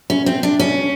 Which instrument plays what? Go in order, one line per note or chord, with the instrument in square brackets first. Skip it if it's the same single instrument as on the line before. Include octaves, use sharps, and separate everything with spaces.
[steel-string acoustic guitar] C#4
C4
D4
C#4